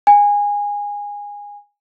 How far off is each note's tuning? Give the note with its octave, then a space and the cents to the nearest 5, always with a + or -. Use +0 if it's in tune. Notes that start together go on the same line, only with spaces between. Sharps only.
G#5 -20